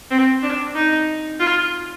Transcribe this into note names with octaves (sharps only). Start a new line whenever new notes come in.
C4
D4
D#4
F4